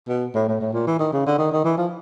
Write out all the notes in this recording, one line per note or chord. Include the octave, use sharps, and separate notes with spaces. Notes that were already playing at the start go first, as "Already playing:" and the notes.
B2
A2
A2
A2
A#2
E3
D#3
C#3
D3
D#3
D#3
E3
F3